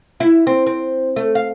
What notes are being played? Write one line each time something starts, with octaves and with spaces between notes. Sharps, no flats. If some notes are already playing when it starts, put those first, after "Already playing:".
E4
C4
C4
A3
F5